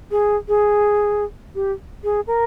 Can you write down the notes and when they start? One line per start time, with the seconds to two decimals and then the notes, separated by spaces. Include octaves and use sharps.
0.11 G#4
0.48 G#4
1.55 G4
2.04 G#4
2.27 A#4